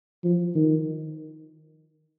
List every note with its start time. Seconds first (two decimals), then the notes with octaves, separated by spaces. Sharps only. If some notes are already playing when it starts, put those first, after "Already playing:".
0.24 F3
0.55 D#3